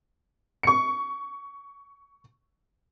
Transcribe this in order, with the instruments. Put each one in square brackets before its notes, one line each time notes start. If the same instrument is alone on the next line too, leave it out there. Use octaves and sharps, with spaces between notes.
[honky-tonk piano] C#6 C#7